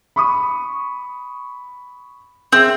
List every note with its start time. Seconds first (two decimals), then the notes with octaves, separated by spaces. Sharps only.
0.16 B5 C#6 D#6
2.52 C4 G#4 E5 E6